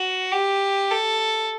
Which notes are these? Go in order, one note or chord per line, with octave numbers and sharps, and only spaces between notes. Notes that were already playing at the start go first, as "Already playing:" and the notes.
Already playing: F#4
G4
A4